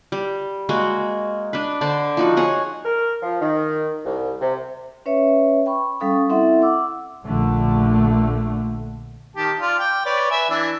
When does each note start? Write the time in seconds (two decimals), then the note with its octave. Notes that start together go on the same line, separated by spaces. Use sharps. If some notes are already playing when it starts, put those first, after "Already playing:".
0.12 G3
0.69 G#3 A#3 F#4
1.53 D4 B4
1.81 D3 C5 D5 A5
2.17 F3 D#4 F#4
2.37 G#4 C#5 F#5 G#5
2.84 A#4
3.22 F3
3.41 D#3
4.05 C2
4.40 C3
5.06 C#4 B4 C#5 E5
5.66 G5 B5 C#6
6.00 G3 C#4 A4 F5 G5 D#6
6.29 C4 E4 A4 E5 F#5 C6
6.62 F#5 D6 E6
7.25 A#1 D3 A3
9.36 D#3 G4 A5
9.59 F4 D5
9.79 G5 D6
10.05 B4 C#5 D5
10.31 B4 E5 G#5
10.50 E3 D4 E4